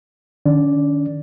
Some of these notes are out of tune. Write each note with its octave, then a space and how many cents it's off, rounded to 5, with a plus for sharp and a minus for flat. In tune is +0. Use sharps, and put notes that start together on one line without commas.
D#3 -45 C#4 +40 D5 -5